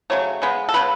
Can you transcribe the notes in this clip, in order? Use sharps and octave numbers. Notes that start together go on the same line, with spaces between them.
C#3 F#3 A3 C#5
C#3 G#3 B3
A4
C#3 G#3 B3 B4